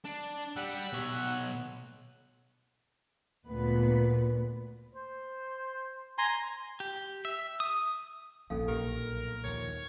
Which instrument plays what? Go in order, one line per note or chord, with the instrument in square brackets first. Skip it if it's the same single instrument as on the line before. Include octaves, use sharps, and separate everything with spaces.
[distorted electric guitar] D4
[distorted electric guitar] G3 [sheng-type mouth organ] F#5 E6 F#6
[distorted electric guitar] B2 C#5
[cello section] D2 A#2 B3 B4
[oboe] C5
[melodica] G#5 A#5 C6
[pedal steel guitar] G4
E5
D#6
[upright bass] A#1 A#3 [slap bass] G#2 F3 [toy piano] C#4 A4 F5
[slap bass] B1 [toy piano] G4 [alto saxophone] A#4
[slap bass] D#2 D#3 F3 [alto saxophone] C#5